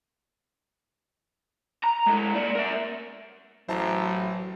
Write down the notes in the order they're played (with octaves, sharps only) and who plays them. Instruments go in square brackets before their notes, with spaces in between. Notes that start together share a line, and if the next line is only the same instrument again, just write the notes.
[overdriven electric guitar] A#5
G#3 E4
A#3 D5
A#4 E5
[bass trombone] A1 [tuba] F#3 [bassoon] E4 [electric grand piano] C5 A5 A#5